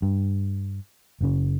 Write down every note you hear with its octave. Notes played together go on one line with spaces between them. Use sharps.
G2
F#1 C#3